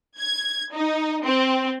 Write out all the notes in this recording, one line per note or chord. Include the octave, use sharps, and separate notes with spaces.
G#6
D#4
C4